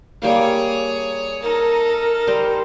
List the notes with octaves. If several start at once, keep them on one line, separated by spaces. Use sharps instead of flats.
G3 A#3 G#4 C#5 F5
D#4 A4 A#4
G3 C5 A#5